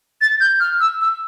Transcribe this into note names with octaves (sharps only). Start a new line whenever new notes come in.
A6
G6
F6
E6
E6